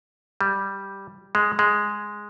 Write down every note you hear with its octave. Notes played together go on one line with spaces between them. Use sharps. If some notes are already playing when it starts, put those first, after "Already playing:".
G3
G#3
G#3